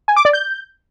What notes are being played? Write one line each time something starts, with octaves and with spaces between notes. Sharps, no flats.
G#5
D6
D5
G6